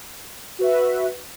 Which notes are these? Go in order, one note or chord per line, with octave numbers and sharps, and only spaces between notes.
F#4 B4 E5